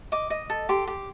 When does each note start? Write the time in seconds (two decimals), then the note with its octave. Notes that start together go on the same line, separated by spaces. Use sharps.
0.12 D#5 D6
0.30 D#5
0.50 A4
0.69 G4 C6
0.87 G4